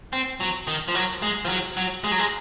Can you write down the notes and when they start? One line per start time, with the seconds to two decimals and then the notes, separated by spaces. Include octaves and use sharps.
0.13 C4
0.40 F#3
0.67 D#3
0.88 F3
0.95 F#3
1.22 G#3
1.45 F3
1.49 F#3
1.77 F#3
2.04 G#3
2.12 F#3
2.19 G#3